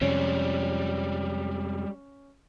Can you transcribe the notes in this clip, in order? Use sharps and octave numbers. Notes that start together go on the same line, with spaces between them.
F2 C3 F3 G3 G#3 C#4